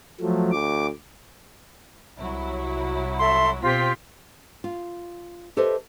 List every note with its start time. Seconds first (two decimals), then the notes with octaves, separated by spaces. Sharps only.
0.21 F3 F#3 A3
0.51 D2 D6
2.18 C2 F#3 E4
3.19 A4 E5 C6
3.63 B2 C4 F4 G4 C5 B6
4.64 F4
5.57 G4 A4 B4 C5 D#5 E5